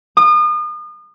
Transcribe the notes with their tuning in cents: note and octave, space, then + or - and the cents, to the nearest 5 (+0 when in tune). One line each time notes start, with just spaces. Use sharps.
D#6 -35